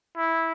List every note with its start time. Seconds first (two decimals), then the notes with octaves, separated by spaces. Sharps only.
0.17 E4